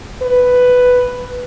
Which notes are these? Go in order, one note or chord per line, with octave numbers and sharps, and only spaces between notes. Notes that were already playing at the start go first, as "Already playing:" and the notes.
B4